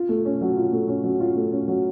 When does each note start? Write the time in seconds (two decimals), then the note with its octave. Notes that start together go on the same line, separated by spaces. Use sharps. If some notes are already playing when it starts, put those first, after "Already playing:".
Already playing: F4
0.09 A3
0.25 C#4
0.41 F#3
0.57 F4
0.72 A3
0.88 C#4
1.04 F#3
1.20 F4
1.36 A3
1.52 C#4
1.68 F#3